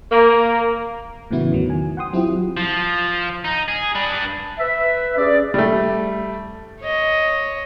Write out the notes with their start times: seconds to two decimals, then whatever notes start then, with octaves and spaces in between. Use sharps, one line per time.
0.12 A#3
1.31 A2 C#3 E3 B3 E4 F#4
1.52 E2 D#3 F#3
1.70 G#5
1.97 F#5 G5 C6 D#6
2.13 F#3 C4 E4 F4 G4
2.57 F3
3.44 D#4
3.68 G#4
3.95 D4 B4
4.59 B4 E5
5.17 C#4 G#4 D5
5.54 G3 A3
6.81 C#5 D#5